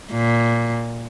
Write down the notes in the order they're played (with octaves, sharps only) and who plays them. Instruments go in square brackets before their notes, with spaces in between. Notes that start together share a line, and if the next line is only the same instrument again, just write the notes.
[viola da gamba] A#2